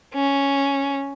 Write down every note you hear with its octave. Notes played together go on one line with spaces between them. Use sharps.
C#4